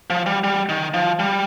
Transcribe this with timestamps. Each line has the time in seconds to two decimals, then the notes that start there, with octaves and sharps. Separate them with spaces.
0.10 F3
0.26 G3
0.44 G3
0.69 D#3
0.94 F3
1.19 G3